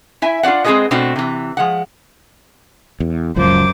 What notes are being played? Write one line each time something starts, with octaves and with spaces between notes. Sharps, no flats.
E4 E5 G#5
D4 F4 F#4 D5 F#5
G#3 C4 F#4 G#4 B4 D#5
B2 A3 C4 D4 F#4
C3 E3
F3 G#3 F#5
E2
F#1 C#2 F#2 F3 C5 D6